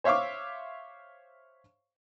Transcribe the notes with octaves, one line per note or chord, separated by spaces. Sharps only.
C5 C#5 E5 F5 C#6 D6